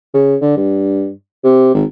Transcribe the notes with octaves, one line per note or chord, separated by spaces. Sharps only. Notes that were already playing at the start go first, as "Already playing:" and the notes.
C#3
D3
G2
C3
G#1